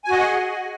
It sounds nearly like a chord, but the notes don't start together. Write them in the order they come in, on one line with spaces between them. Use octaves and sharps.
G#5 F#4 D#5 F#5 G#4